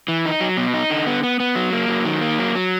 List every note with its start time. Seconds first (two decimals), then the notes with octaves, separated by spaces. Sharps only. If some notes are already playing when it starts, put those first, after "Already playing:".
0.08 E3
0.25 D#4
0.41 F#3
0.57 B2
0.74 D#4
0.90 D3
1.06 B3
1.23 B3
1.40 B3
1.55 F#3
1.73 A#3
1.88 F#3
2.05 D#3
2.21 A#3
2.39 F#3
2.55 F#3